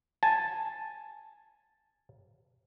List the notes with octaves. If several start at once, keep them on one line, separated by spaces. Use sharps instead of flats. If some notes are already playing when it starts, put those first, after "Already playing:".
G#5 A5